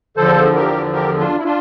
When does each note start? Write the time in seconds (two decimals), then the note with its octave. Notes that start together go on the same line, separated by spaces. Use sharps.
0.17 E2 D3 F3 A4 C5
0.55 G4 A#4
0.93 G4 A#4
1.19 D4 F4
1.38 E4
1.44 D4 F4